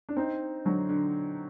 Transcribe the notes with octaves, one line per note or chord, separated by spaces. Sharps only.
D4
C4 D#4
D3 F#3
D3